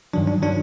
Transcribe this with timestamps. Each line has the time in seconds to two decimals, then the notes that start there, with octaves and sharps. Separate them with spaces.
0.13 G2 D#3 F#3 D4
0.28 D4
0.42 D#3 F#3 D4